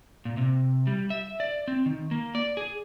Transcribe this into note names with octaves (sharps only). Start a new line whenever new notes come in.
A#2
C3
G3
E5
D5
C4
D#3
A#3
D5
G#4